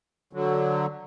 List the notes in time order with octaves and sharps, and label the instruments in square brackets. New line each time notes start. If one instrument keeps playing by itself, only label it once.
[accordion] D3 F#3